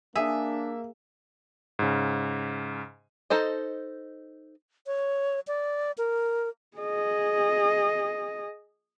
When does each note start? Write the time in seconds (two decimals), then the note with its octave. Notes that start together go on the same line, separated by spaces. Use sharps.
0.16 A#3 D4 G#4 E5
1.79 G#2 C#3
3.30 D#4 A4 C5 D#5
4.87 C#5
5.47 D5
5.98 A#4
6.77 G#4 D#5